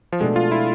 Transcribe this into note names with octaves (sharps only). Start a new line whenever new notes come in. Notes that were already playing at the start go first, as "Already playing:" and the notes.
F3
B2 G#3 A3 D4
F4
E4